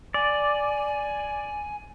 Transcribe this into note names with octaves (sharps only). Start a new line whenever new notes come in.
D5 G#5